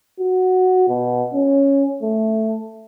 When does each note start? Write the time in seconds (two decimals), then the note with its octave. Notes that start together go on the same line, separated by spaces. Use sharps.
0.20 F#4
0.89 B2
1.33 C#4
2.03 A3